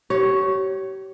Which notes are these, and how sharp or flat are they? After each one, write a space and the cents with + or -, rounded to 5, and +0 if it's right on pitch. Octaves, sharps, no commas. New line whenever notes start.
G4 -35 C#5 +0